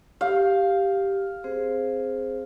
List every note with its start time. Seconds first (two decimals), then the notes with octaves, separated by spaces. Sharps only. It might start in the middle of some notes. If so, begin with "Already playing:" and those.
0.21 G4 F5
1.44 C4 G#4 C5